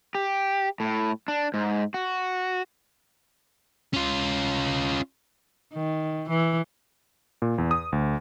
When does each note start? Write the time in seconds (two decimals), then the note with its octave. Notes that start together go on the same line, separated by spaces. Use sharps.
0.15 G4
0.80 A2
1.28 D4
1.54 G#2
1.94 F#4
3.94 C#4 F4
5.74 D#3
6.29 E3
7.42 A#2
7.58 E2
7.71 D#6
7.92 D2